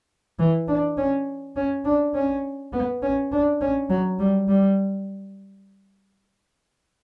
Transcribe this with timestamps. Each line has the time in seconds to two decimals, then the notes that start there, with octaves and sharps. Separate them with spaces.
0.39 E3
0.68 D4
0.97 C#4
1.56 C#4
1.85 D4
2.15 C#4
2.73 B3
3.02 C#4
3.32 D4
3.61 C#4
3.90 F#3
4.19 G3
4.48 G3